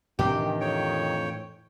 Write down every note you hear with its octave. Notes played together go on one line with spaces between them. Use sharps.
A2 C3 D#3 E3 D4 G4
F2 C#5 G5